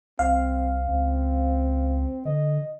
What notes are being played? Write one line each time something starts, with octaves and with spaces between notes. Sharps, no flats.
C2 C4 F5
C#2 C4
D3 D#5